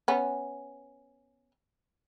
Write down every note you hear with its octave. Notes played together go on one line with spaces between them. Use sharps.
B3 C#4